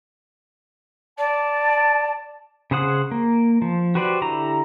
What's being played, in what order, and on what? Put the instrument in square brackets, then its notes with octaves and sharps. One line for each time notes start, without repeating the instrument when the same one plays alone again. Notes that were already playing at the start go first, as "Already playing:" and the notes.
[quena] D5 [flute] A5
[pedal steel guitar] C#3 G#4 C5 F#5 D#6
A#3
F3
F#4 G4 B4 C5 D5
D3 E4 G4 A#5